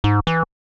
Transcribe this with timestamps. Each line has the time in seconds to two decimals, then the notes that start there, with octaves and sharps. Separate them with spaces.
0.04 G#2
0.27 E3